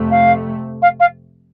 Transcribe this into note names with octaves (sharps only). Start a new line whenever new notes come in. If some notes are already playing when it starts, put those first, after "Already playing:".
Already playing: F2 C3 A3
F5
F5
F5